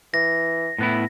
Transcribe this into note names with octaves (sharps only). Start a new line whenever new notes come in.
E3 A#6
A2 B3 E4